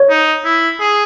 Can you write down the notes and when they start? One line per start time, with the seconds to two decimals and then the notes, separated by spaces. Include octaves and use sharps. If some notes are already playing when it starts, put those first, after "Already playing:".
Already playing: C#5
0.10 D#4
0.45 E4
0.80 G#4